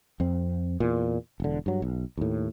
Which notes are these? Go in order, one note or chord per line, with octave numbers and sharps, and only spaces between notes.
F2 C4
E2 A#2
E1 D3
G2 F#3
B1
D#2 A2